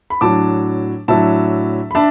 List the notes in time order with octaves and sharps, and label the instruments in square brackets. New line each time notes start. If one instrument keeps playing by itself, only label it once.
[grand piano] B5
A2 F#3 D4 A5 D6
A2 F#3 D4 E5 A5
B5
D4 E5 A5